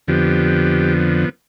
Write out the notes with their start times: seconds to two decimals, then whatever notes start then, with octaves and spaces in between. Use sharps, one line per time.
0.08 F2 D3 F3 B3 G4